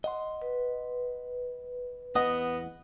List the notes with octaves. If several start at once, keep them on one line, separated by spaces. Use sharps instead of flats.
D#5 F#5 C6
B4
E2 B3 D#5 F#5